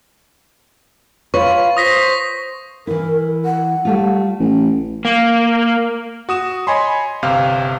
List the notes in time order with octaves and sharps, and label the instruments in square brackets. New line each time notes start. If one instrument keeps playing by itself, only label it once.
[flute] F4 [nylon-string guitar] B4 C#5 [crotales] C#6
[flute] C5 [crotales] D#6 A#6 B6
[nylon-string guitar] E3 E4 [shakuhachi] A#4
[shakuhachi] F#5
[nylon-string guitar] G3 A3 F4
[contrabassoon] A1
[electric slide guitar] A#3
[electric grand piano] F#4 D#6 E7
C#5 D#5 G#5 B5 C6
G1 C3 F5 F6